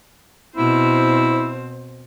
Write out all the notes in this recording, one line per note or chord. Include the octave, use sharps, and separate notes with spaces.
B2 C4 E4 C5